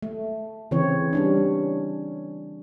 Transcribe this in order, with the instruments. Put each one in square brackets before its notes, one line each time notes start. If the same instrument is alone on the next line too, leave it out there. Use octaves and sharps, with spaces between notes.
[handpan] A3
C#3 E3 C4 C#5
G3 C#4 D4